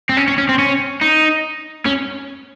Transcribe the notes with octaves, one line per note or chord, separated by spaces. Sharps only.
C4
C#4
C#4
C#4
C4
C#4
D#4
C#4